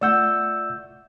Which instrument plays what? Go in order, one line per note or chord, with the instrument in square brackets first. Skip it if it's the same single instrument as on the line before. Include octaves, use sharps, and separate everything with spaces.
[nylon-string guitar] A3 F4 F#5 [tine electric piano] D5 E6 G6